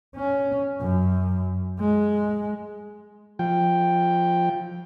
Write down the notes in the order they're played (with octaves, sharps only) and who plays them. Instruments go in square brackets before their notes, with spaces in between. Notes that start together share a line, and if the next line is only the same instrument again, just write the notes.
[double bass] C#4
F#2
G#3
[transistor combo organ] F3 G5